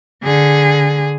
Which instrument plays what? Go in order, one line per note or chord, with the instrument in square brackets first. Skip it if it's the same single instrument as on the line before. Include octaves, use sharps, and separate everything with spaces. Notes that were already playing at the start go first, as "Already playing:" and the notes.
[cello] D3 G#4